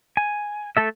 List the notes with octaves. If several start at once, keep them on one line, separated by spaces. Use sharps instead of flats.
G#5
A3 A4 E5